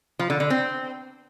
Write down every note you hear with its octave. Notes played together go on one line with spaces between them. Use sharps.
F3
D3
D3
C4